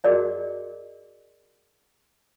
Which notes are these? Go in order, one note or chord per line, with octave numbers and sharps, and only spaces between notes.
F#4 G#4 A#4 D5 D#5